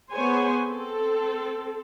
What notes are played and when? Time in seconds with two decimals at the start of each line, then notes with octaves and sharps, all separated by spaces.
0.13 B3 G#4 C5 C#5 G#5
0.68 C4 A4